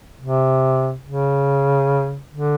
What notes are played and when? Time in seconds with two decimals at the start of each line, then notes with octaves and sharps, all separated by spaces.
0.21 C3
1.05 C#3
2.31 D3